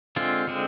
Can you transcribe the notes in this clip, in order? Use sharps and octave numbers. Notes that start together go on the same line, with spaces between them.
D3 G#3 C4 F4
D3 G#3 C4